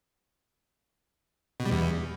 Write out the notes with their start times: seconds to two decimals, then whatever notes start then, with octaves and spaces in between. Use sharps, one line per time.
1.60 B2
1.66 G3
1.71 E2